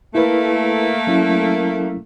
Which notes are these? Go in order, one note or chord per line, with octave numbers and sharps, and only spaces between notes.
A3 A#3 E4 B4
F#3 C#4 E4